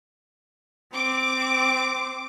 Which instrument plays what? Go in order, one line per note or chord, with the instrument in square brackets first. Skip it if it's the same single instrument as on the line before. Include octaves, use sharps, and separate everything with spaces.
[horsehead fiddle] C4 [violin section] D6